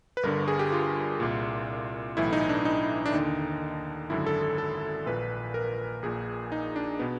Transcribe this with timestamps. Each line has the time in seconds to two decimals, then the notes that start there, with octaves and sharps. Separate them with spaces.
0.17 B4
0.23 G1 G2 D3 A#4
0.48 G#4
0.59 G4
0.72 F4
1.20 C2 A#2
2.17 B1 A2 E3 E4
2.33 D#4
2.49 D4
2.65 D#4
3.06 D4
3.13 D#2 D3 D#4
4.10 G#1 F#2 D3 E4
4.26 A4
4.42 A4
4.58 A4
5.06 A#1 A#2 B4
5.54 A#4
6.03 A#1 A#2 G#4
6.52 D#4
6.76 D4
6.99 B2 B3